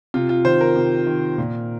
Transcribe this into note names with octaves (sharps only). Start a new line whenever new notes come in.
C3 F4
F4
D#3 C5
A#4
C3
D#3
A#2